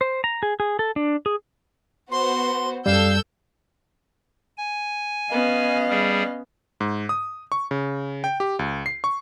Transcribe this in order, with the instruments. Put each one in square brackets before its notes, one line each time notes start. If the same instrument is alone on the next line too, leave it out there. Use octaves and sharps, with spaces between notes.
[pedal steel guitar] C5
A#5
G#4
G#4
A4
D4
G#4
[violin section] B3 F#4 C5 [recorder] C6
[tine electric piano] F#2 G3 [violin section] A4 E6 G6 [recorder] F5
[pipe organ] G#5
[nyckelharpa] B3 C#4 [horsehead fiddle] D#5 F5
[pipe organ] G3 G#4
[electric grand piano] G#2
D#6
C#6
C#3
G5
G4
C#2
C7
C#6